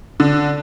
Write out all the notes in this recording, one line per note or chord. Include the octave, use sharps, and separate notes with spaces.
D3